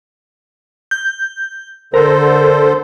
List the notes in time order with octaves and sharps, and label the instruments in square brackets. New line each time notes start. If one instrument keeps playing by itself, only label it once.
[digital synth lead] G6
[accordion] D3 A4 C5 [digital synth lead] A#4